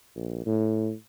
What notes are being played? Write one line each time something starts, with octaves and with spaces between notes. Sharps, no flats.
A#1
A2